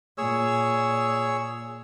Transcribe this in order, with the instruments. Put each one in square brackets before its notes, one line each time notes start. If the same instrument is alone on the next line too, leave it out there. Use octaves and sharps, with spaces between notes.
[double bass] A#2 [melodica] G#4 C#5 E6